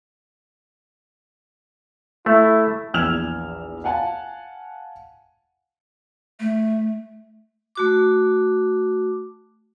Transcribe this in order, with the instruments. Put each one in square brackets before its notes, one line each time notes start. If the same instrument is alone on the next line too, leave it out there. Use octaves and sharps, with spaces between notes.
[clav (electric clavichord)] A3 [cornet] E4
[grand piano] A#1 E2 E6 F6 G#6 F7
F5 F#5 G#5 A5
[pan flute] A3
[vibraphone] A3 F#4 D6